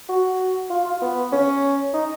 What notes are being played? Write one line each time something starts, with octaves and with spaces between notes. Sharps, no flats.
F#4
F4
F4
B3
C#4
D#4